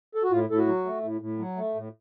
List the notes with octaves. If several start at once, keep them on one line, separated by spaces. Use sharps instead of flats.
A4
F#4
A2 F4
A2 A4
F#4
F#3
A3
A2
A2
F#3
A3
A2